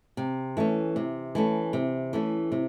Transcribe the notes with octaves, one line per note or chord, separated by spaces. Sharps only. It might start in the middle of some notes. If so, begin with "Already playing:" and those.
C3
E3 A3 C#4
C3
E3 A3 C#4
C3
E3 A3 C#4
C3